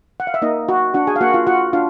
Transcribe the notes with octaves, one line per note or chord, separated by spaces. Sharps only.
F#5
F5
E5
A#3 D#4 D#5
F#4
D4 F#4 F#5
G#4 G#5
F5
A#3 F#4 F#5
F4 F5
F4 F#4 F#5
D4 F4 F5